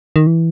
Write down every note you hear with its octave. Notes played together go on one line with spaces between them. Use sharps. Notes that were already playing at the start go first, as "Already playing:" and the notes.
D#3
E3